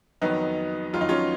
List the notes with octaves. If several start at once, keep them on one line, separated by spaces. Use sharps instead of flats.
F2 D#3 F#3 B3 D#4
F2 D#3 F#3 F4
D#4
C#4 F4